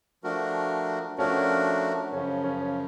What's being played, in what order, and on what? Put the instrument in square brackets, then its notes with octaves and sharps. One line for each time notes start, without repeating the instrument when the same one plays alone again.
[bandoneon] F3 A3 D4 F#4 A#4
[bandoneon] F3 A3 D4 F#4 A#4 [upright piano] C#4
[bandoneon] F#2 C#3 F3 [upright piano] C#4
[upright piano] C#4